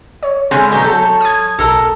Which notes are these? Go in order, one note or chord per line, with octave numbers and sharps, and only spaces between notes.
C#5
D3 G#3 C4 G#5 B5 F6
B2 F#3 G6
F#3 A4 C#5
D#6 G#6
B1 A4 A#4 A5